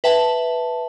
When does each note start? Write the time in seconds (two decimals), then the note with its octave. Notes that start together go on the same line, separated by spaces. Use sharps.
0.04 B4 E5 G5 A5